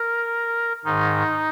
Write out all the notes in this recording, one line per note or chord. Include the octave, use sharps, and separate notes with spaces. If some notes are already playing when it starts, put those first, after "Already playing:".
Already playing: A#4
G#2 D#3 D#4